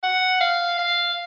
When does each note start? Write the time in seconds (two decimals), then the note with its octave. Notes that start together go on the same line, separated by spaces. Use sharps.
0.03 F#5
0.41 F5
0.79 F5